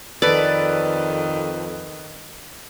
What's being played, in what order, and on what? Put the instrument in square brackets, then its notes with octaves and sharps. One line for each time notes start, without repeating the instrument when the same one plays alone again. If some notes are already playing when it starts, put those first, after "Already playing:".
[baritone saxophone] F2 [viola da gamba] D#3 [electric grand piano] A4 B4 [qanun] D5